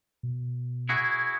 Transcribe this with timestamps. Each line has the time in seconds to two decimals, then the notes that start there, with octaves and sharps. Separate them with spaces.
0.23 B2
0.89 E4 F#4 G#4